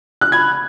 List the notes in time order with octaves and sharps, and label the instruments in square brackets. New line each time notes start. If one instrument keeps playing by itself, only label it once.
[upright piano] F#6
[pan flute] B5 [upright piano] G#6